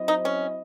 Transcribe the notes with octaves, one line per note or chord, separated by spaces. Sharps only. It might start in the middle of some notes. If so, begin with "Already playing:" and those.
Already playing: F#3 C4 E4 C5 D#5
D#4
C#4